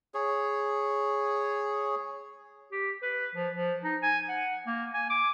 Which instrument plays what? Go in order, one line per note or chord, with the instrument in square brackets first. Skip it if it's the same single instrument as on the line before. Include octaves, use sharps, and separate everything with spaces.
[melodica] G#4 C#5
[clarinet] G4
B4
F3
F3
D#4
G#5
F#5
A#3
G#5
D6